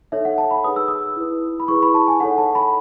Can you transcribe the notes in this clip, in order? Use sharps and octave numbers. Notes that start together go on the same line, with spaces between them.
D#4 A4 C#5 E5
F#5
A5
B5
D#4 G#4 B4 D#6
E6
D#6
E4 B4
B5
E4 G#4 B4 C#6
B5
A5
G#5
D#4 A4 C#5 F#5
A5
B5